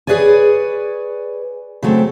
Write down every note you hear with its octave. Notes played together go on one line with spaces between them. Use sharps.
G#4 B4 C#5 D5 G#5
C#3 F#3 A3 C4